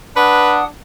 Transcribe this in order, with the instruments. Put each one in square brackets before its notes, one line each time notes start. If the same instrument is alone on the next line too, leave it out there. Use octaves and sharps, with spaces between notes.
[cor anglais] D4 [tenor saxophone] B4 [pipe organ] F#5 D#6